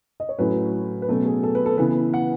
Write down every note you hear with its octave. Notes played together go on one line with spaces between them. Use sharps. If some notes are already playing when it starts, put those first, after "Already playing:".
D#5
C#5
A2 F#3 C#4 B4
B4
B2 F#3 A3 C#4 A4
G#4
A4
B4
A4
C#3 E3 B3 B4
F#5